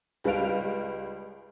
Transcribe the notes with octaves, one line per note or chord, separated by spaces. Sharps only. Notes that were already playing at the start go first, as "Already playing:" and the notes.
C#2 G3 B4 F5 D7 F7